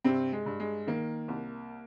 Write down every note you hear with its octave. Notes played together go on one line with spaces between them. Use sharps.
G2 C3 C4
G#3
G2
G#3
D#3 A#3
C2